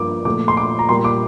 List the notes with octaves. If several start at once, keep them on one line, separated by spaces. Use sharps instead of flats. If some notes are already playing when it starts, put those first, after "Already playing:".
Already playing: G2 F3 A#3 D6
A#2 F3 A3 D6
C6
D6
A#5
A#2 G3 A#3 C6
D6